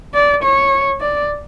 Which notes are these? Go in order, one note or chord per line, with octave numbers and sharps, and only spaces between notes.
D5
C#5
D5